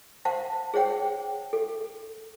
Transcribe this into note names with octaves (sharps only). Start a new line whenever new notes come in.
C5 F5 F#5 A5
G#4 C5 C#5 F#5 G5
A4